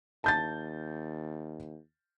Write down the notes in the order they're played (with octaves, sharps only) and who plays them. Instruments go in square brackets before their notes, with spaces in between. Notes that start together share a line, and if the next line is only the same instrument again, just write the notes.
[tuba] D#2 [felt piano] A5 G6 A6